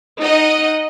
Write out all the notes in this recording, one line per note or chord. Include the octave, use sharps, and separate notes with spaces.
D#4 D#5 F#5